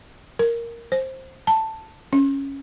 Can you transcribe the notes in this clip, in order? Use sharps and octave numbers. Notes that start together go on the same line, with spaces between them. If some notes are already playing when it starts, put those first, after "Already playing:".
A#4
C5
A5
C#4